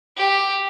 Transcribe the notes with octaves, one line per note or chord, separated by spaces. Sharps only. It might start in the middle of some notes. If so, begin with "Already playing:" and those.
G4